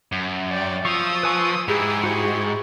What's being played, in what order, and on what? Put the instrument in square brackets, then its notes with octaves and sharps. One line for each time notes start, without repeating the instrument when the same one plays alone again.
[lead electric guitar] F#2
[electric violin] D5 G5
[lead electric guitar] F3 [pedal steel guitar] C#6 [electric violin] D#6 E6
[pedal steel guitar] B4 G#5 C#6
[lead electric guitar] G#2 [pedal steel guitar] E4 [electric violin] G4 [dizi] G#4
[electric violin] E4 G4 [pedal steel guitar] F#4 C5